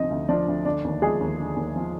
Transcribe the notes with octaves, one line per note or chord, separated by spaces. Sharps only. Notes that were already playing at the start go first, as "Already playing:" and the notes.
Already playing: D2 C3 F3 D#4 D#5
D2
F3 D4 D5
D2
D3 D4 D5
D#2
F3 G#3 G#4
D#2
D3
D#2
F3